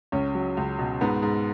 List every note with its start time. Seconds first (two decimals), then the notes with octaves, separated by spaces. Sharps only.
0.12 C#2 C#4
0.35 F#3
0.57 C#2
0.79 B2
1.01 G#2 B3
1.23 G#2